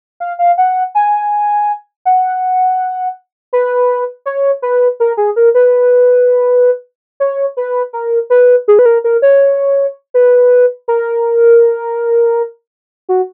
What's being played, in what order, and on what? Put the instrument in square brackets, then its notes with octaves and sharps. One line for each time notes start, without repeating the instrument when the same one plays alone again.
[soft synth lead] F5
F5
F#5
G#5
F#5
B4
C#5
B4
A#4
G#4
A#4
B4
C#5
B4
A#4
B4
G#4
B4
A#4
A#4
C#5
B4
A#4
F#4